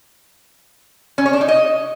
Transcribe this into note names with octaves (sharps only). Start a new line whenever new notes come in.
C#4
C#5
D4
D#4
D#5